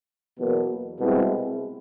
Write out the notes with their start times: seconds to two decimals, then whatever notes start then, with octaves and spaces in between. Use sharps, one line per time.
0.38 E2 B2 F#3 A#3
0.99 C2 B2 G#3 C4 E4